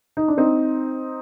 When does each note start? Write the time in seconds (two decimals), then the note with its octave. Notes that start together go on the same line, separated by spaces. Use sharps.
0.17 D#4
0.28 D4
0.37 C4 D#4